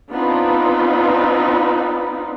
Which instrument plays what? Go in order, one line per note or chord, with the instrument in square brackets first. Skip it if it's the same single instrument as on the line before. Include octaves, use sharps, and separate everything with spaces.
[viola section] B3 C4 D4 D#4 F4 B4